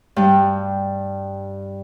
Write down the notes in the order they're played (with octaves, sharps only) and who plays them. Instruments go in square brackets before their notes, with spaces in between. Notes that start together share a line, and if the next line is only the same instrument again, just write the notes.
[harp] G2 G3